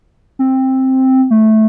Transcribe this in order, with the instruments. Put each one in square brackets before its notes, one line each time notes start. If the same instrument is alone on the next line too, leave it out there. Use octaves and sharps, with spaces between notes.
[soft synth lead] C4
A3